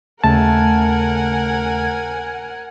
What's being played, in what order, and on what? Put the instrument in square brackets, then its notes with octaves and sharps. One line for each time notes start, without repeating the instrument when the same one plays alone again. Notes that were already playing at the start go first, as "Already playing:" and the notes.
[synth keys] D#2 C#3 A3 [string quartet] A#4 F#5 G#5 [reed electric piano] A5